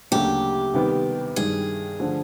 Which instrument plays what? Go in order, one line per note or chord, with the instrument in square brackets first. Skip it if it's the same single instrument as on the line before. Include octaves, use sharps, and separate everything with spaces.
[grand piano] D2 C#3 F#3 A#3 D4 [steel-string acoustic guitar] G4
[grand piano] C3 D#3 G3 B3
[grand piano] G2 D#3 G3 [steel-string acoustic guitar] G#4
[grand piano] D3 F3 A3 D4